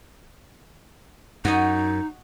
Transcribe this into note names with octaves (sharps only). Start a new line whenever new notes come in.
F#2 D#4 F#4 D#5